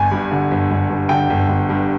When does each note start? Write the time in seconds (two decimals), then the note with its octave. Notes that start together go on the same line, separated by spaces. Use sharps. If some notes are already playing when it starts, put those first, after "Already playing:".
Already playing: G1 G#5
0.11 G2
0.31 D3
0.51 G1
0.71 G1
0.89 G2
1.09 D3 G5
1.30 G1
1.49 G1
1.69 G2